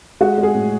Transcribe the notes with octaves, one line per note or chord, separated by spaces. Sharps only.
G#3 F#4
G#3
G#4
A2